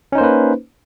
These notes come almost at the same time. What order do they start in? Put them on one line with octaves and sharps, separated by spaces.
C#4 D#4 C5 A#3 B4